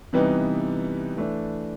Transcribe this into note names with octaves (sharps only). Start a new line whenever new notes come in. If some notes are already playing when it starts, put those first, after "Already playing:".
C3 E3 G3 B3 D#4
E3 A3 D4